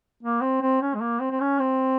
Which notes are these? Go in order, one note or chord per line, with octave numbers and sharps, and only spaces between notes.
A#3
C4
C4
C#4
G#3
A#3
C4
C4
C#4
C4